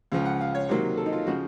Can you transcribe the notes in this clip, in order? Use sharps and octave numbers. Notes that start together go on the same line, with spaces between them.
C#2 C#3 F3 F5
F#5
F5
C#5
C3 D#3 F#3 A#3 C5
A4
D#4
F4
C#3 F3 F#4